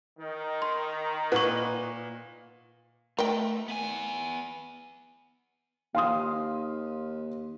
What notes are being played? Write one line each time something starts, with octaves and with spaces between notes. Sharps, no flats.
D#3
C6
A#2 B4 F#5 C#6
A3 A#4 D#5 G5
B3 G#5
D#2 F5 C6 D#6